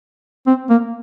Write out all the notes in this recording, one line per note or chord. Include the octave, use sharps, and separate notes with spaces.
C4
A#3